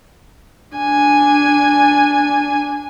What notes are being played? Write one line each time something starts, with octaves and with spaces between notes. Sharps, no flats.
D4 G#5